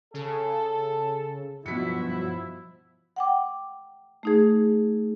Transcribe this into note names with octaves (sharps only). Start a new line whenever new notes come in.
C#3 A4
G2 B2 F3 F#3 E4 F#4 B6 C#7
F#5 G5 D6
A3 D#4 G#4